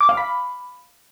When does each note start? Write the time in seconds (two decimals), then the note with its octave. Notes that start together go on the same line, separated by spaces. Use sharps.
0.01 D6
0.09 F5
0.17 B5